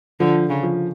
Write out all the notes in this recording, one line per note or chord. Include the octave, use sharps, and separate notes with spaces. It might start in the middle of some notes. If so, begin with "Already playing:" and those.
D3 F3
C#3
F3